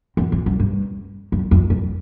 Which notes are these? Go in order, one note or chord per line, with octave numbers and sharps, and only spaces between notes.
E2
F2
F#2
G2
F#2
F2
F#2